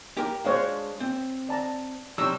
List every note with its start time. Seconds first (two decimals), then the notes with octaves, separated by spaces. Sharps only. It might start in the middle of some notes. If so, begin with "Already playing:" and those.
0.17 G4 A#4
0.45 G#3 D4 C5 C#5 F5
1.00 C4
1.49 D5 A5 A#5
2.18 C3 F#3 G3 E6